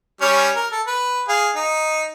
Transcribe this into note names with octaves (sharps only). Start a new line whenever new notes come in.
G3 C#4 C#5
A#4
A4
B4
G#4 F5
D#4